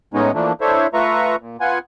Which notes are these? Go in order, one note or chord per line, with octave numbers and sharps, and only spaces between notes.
A2 G#3 B3 C#4 D#4
E3 F3 A3 A#3 D4
D4 E4 A4 C5 C#5 E5
A3 F4 B4 E5 A#5 C#6
A#2
B3 F4 F#5 G#5